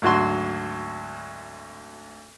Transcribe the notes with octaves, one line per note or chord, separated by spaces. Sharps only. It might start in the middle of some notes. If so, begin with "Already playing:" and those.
G#1 D2 F#3 F#4 C6